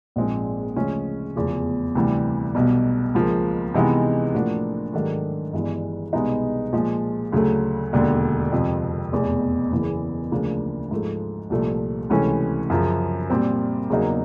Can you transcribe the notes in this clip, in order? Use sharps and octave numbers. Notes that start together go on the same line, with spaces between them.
A#1 G#2 F3 G#3 C4
D2 C#3 F3 G#3 C#4
F1 E2 C#3 F3
D2 C3 E3 G3
B1 B2 G3
C#2 C#3 F3 A#3
C3 E3 G#3 B3 D#4
A2 F3 A#3 D4 F#4
G#2 D#3 F#3 A3 D4
G1 G2 E3 G#3
C2 B2 G#3 B3 D#4
A#2 F3 G#3
D2 C#3 F#3 A3
E1 D#2 D3
F2 C3 F3
F1 E2 B2
F#1 E2 C#3 E3
D2 C#3 F3 A#3 D4
G#2 F3 A3
C2 A#2 F3 A3
C#2 C3 E3 A3 C#4
F#2 C#3 F3
A#2 G3 C4
E2 C#3 F#3 A#3 D#4